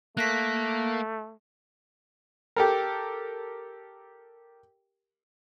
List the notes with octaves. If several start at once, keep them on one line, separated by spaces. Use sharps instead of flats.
A3 A#3 F#6 A#6 B6
G4 A4 A#4